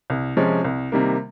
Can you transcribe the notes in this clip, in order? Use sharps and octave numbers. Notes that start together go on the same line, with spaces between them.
C2
C3 F3 G#3 C#4
C2
C3 D#3 G3 A#3